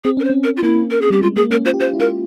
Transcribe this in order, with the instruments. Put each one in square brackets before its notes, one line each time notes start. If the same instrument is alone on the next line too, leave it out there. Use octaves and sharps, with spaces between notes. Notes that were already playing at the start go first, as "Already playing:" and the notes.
[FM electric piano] C4 [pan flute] G#4
[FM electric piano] C#4 [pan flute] A#4
[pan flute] C5
[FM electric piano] C4
[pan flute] A#4
F4
[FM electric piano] A#3 [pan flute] E4
[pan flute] A#4
G#4
[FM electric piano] G3 [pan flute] G4
[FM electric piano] G#3 [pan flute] F4
[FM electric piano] A#3 [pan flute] G#4
[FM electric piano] C#4 [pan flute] A#4
[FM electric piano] F4 [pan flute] C5
[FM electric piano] G4
[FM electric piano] F4 [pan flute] C5
[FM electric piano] E4
[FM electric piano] F4 [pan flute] A#4